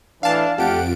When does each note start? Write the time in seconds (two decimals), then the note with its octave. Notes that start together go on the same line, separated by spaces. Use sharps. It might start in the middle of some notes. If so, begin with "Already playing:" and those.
0.23 A2 E3 D4 F5 A5
0.58 F2 A3 G4 F#5 D7